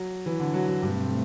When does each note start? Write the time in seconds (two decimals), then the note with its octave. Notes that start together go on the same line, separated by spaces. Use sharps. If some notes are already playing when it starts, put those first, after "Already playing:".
Already playing: F#3
0.26 E3
0.40 D3
0.54 F#3
0.68 F#3
0.82 G2 B2 A3 C4